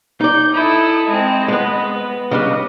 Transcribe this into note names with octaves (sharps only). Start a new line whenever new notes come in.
D#4 D5 G6
E4 A4 D#6
G#3 C4 D#5
G#3 B3 B4
C#3 G3 D4 D#5